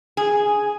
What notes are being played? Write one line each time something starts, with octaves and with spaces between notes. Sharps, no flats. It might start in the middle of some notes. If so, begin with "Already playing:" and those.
G#4